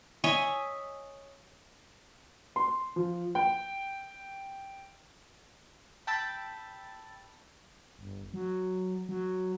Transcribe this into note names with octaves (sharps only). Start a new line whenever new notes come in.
C#5 D#5 E5 G#5
C6
F3
G5
G5 A5 B5 E6 A6
G1
F#3
F#3